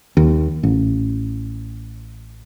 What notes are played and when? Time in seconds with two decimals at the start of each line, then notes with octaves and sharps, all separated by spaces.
0.17 D#2
0.63 A1